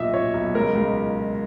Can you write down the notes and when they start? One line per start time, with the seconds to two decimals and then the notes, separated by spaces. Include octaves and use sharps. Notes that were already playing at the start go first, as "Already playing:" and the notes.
Already playing: B1 A#2 D#5 E5
0.13 A#2 C#5
0.34 B1
0.55 C#2 A#4
0.75 C#2